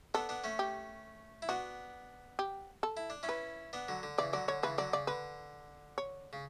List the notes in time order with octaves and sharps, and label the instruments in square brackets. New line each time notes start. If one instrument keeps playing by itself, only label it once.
[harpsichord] B3 D4 [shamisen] A4
[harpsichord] B3 D4
A3 C#4
[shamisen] G4
[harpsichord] E4
[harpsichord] B3 D4 [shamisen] F#4
[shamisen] G4
A4
[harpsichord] E4
D4
C#4 E4
[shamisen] B4
[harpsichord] B3 D4
D3 F#3
D3
[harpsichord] C#3 E3 [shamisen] D5
[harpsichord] D3 F#3 [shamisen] D5
[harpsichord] D3 [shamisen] C#5
[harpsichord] C#3 E3 [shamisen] B4
[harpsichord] D3 F#3 [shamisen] D5
[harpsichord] C#3 [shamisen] D5
[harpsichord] D3 [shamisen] B4
[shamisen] C#5
[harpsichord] C#3